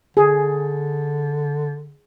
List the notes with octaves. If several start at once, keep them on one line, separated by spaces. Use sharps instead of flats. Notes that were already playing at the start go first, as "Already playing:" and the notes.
D3 G#4